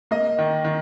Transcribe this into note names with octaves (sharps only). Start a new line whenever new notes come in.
A#3 D#5
D#3
D#3